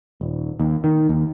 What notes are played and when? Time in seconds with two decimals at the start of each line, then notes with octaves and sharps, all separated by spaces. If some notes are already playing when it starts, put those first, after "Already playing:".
0.21 D#1
0.60 D#2
0.84 D#3
1.09 D#2